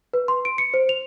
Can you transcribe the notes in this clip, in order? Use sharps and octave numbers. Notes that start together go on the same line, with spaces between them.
B4
C6
D7
C#7
C5
F7